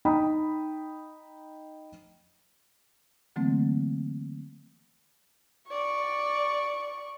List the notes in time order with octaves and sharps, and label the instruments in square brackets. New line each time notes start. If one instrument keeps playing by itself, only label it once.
[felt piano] D#4 D#5 G5 A#5 B5 D#6
[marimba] D3 E3 F#3 A3 A#3 C4
[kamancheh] D5 C#6